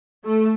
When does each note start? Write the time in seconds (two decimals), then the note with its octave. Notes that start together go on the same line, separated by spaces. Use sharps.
0.24 A3